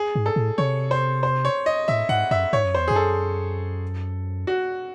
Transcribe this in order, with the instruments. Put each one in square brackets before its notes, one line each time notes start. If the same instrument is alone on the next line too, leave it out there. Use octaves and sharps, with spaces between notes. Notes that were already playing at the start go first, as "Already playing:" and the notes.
Already playing: [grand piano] G#4
[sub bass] G#2
[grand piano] A4
[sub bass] A2
[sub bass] C3 [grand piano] C#5
[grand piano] C5
C5
C#5
D#5
[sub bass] A2 [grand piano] E5
[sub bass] G#2 [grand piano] F#5
[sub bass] F#2 [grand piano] E5
[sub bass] G#2 [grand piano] C#5
[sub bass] F#2
[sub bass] E2 [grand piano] C5
[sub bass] F#2 [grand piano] G#4
[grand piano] A4
F#4